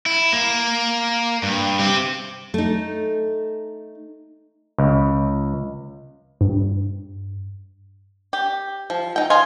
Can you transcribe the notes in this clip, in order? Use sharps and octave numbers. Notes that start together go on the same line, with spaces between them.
E4
A#3
G2
C4 G4
A3 D#4
C#2
G2
G4
F3
D#4 G5
F4 D#5 G#5